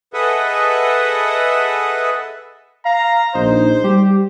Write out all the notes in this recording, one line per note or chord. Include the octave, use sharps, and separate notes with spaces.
G#4 A4 B4 D#5 E5 F#5
F5 A#5
A#1 D#4 C5
G3 G4